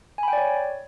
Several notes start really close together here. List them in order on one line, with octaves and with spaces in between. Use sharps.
G#5 B5 G5 D5 C#5